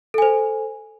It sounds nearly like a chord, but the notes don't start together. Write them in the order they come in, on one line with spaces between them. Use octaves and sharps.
A4 G#5 C5